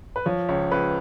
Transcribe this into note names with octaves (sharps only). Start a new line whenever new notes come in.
B4
F3 C#5
C#2 C#5
C#2 B4